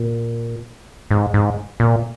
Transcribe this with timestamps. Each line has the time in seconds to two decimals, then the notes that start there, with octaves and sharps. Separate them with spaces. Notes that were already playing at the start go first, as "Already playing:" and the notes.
Already playing: A#2
1.11 G#2
1.34 G#2
1.80 A#2